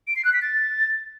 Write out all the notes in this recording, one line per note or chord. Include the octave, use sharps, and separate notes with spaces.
D7
C7
F#6
B6
A6